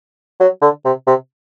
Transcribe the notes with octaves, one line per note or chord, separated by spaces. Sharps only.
F#3
D3
C3
C3